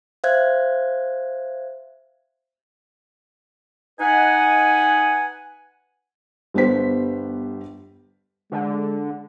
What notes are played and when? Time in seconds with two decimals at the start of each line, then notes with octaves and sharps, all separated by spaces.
0.24 C5 E5 F5 F#6 G#6
4.00 D#4 B4 F#5 G#5
6.54 G1 G3 B3 G4 C5 B6
8.52 D3 G#3